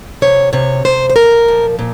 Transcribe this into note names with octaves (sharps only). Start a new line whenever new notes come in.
C3 C#5
C3 C#5
C3 C5
C5
A#2 A#4
F3
A#2